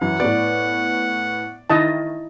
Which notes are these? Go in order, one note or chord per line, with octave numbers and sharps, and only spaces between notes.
F#2 E3 F#5
A2 B3 D5
D#3 E4 D#5 A5